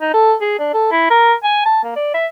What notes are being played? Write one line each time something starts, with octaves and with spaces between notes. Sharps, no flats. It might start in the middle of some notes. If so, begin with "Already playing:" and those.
D#4
A4
G#4
D4
A4
E4
A#4
G#5
A5
A#3
D5
E5